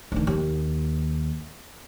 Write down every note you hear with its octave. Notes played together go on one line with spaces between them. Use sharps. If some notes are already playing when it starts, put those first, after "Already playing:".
D2 D#3
D#2